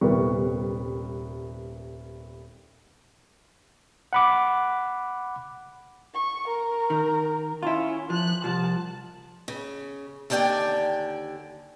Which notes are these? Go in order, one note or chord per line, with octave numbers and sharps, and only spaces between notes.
D#1 C2 G3 B3 A#4 C#6
F#5 B5 D6
C#6
A#4
D#3
C#4 E4 F4
F3 F#6
C2 F3 A5
C#3
D#2 D3 D5 E5 G5 G#5